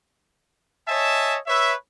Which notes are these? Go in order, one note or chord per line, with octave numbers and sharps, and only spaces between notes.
C#5 D#5 E5 G#5 A5
B4 C#5 E5